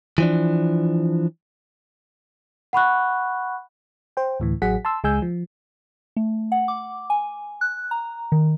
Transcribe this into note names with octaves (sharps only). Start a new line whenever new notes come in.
E3 F3 D4
F#5 B5 C#6 F#6
C5 G5
D2 A2 E3
A1 F#3 G#4 F#5 B6
A5 C6 E6
C#2 G#3 G#5 E6 G6
F3
A3
F#5
D6
G#5
F#6
A#5
D#3